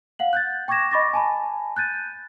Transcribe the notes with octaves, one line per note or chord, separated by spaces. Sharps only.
F5 F#5 F#7
F#6 G6 A6
G5 C#6 D6 G#6 A#6 E7
D#5 B5 C#6 D6 A6 A#6
G#5 A5 B5
F#6 G6 A6 D#7